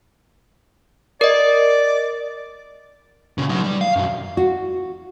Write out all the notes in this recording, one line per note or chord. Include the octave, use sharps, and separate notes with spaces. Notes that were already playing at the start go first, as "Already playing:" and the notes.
A#4 D5 D#5
A#2 C#3
F#3 D#4
G3
F5
B1 F#2
F#4